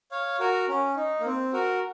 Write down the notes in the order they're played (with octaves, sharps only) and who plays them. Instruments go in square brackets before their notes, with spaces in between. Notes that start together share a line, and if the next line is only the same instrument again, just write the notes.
[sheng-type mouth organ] C#5 F5
F#4 A#4
C#4
D#4
A#3
C4
F#4 A#4